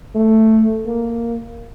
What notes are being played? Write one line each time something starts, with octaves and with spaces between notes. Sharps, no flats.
A3
A#3